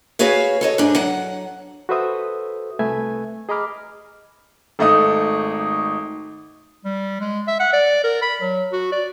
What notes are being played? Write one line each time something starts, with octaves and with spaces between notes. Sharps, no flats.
F#4 G#4 B4 C#5 F5
A4 C#5 D#5
G#2 D4
F#3 F#5
F#4 A4 B4 C5 E5 D#6
C2 A3 B4 E5 G#5 G#6
G#4 D#5 A#5 B5 D6 F6
G#1 A3 D#4 D#6
G3
G#3
E5
F#5
D5
A#4
B5
F#3
F#4
D5